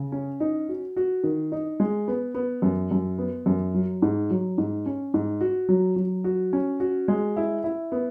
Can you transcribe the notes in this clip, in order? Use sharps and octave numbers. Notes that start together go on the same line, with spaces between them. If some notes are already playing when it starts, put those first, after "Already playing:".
Already playing: C#3
C#4
D#4
F#4
F#4
D#3
D#4
G#3
B3
B3
F#2
F#2
B3
F#2
F#3
G#2
F#3
G#2
C#4
G#2
F#4
F#3
F#3
F#4
C#4
F#4
G#3
E4
E4
B3